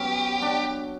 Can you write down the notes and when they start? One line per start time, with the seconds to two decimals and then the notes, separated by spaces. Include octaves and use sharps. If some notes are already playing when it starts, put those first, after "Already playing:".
Already playing: F#3 B3 C#4 G4
0.42 D4